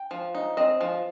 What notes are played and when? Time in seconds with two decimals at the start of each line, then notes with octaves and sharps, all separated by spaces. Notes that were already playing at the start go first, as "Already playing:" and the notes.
Already playing: G5
0.11 F3
0.35 D#4
0.57 C4 D#5
0.81 F3